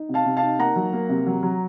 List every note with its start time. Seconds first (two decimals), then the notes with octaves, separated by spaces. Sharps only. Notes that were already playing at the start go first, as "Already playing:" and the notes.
Already playing: D#4
0.09 C3
0.14 F5 A5
0.25 C3
0.37 F5 A5
0.43 D#4
0.59 A#3 F#5 A#5
0.76 F#3
0.93 A#3
1.09 C3
1.26 F#3
1.43 F#3